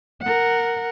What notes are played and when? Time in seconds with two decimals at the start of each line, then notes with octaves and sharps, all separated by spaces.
0.22 A#4 F#5